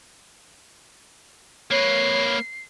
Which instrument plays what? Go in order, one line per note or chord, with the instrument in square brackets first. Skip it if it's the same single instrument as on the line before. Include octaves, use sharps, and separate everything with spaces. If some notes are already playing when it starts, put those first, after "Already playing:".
[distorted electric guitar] A#3 B4 [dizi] C#5 [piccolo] C7